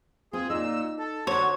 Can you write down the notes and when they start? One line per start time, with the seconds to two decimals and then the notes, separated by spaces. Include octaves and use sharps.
0.33 C4 F4 G#4
0.50 A#2 D#4 E6
0.99 A4
1.27 D3 F#3 C5 C#5